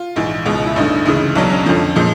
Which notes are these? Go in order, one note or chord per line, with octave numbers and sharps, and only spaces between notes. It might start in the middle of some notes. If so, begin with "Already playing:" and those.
Already playing: F4
A#1 G#2 E3
C#2 B2 G#3
E4
A1 G2 D3 D#4
D2 C#3 E3 G#3
B1 B2 F#3 D4
C#4
F2 D3 F3
A#2 F3 G#3